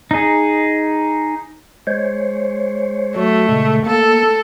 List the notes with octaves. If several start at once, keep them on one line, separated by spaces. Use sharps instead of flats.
D#4 G#4
G#3 C5 C#5
F#3 A3 F#4
A#2 C#3 G#3
A#3 A4